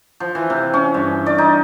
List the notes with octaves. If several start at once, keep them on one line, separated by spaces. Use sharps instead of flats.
F3
E3
C3
C#4
G2
D5
D#4